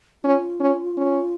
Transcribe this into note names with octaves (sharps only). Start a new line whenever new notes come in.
C#4 F4
C#4
C#4